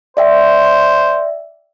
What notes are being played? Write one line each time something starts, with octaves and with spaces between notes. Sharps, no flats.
C5 D5 E5 G5